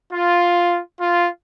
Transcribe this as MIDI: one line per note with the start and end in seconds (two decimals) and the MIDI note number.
0.12 0.80 65
1.00 1.26 65